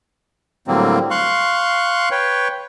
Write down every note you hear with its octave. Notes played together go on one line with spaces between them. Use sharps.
A2 D3 F#3 G3 A#3 C4
F5 C6 C#6 F#6
B4 C#5 G5